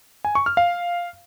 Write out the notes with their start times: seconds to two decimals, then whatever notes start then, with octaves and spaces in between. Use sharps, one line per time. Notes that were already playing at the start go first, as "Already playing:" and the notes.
0.25 G#5
0.35 C#6
0.46 F6
0.57 F5